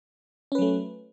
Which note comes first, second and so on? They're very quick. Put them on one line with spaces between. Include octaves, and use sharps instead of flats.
C#4 B4 F#3 A3